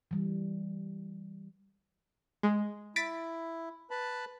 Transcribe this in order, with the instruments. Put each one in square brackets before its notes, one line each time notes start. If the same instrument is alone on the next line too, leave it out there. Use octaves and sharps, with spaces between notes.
[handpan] E3 G3
[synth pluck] G#3
[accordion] E4 [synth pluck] A6 B6 D7
[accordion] B4 A5 B5